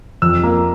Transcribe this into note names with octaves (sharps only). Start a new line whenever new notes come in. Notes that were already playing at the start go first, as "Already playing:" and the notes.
F2 E6
A#3